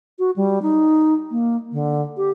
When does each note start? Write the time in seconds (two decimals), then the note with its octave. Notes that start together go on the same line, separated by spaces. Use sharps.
0.19 F#4
0.36 G3
0.62 D#4
1.31 A#3
1.72 D3
2.17 G4